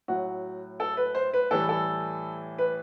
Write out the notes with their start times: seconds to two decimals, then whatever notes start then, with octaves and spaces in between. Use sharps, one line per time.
0.08 A2 F#3 F#4
0.80 A4
0.97 B4
1.15 C5
1.34 B4
1.51 A2 E3 G3 A4
1.69 A4
2.58 B4